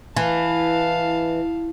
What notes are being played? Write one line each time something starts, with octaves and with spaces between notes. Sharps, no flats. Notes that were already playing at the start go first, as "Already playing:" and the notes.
E3 F5 A5